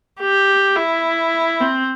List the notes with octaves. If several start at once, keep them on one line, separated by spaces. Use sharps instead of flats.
G4
E4
C4